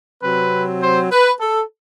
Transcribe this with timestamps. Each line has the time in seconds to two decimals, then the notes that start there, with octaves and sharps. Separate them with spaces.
0.23 C3 F#3 C4 B4
0.81 C5
1.11 B4
1.40 A4